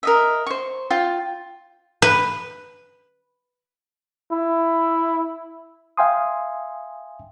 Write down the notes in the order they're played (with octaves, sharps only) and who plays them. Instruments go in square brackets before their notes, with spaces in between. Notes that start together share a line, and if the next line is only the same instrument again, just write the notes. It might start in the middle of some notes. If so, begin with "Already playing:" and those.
[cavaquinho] A#4 D#5 E5
C5 C#6
F4 G5
[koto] B4
[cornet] E4
[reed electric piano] E5 F5 G5 G#5 C6 D#6